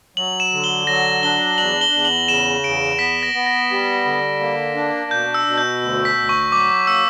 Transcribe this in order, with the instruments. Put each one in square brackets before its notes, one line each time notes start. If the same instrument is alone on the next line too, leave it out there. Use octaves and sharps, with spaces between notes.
[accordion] F#3 [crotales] F#7
[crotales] E7
[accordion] D3
[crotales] G7
[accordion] F#3 [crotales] A#6
[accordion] D4 [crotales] G7
[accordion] E2 [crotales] F#7
[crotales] G7
[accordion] E2
[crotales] F#7
[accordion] C#3 [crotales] E7
[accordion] E2 [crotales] D7
[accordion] B3 [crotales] B6
[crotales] A#6
[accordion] B3
[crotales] A#6
[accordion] G3
D3
A#3
D4
[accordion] B2 [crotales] G6
[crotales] E6
[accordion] B2
[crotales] G6
[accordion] D2
[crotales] B6
[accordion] D2
[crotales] C#6
[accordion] F#3 [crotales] D6
[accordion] A#3 [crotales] E6